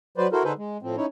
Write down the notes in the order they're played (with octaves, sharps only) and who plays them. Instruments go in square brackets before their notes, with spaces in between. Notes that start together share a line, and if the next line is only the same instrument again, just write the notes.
[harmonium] F#3 B4 C5 D5
E4 F#4 A4 A#4 C5
D3 D#4 G#4 A4 B4 C5
G#3
A2 F3 C4
C#4 D#4 E4 C#5